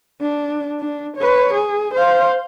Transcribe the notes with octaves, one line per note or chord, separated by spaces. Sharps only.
D4
D4
B4 C#5
G#4
C5 F5